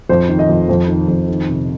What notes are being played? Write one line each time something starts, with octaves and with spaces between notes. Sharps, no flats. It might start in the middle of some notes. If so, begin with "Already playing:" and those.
F2 C5
D#3
D#5
F2
F2 C5
D#3
F2
D#3
C3